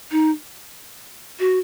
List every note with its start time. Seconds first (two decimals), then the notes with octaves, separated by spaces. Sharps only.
0.12 D#4
1.40 F#4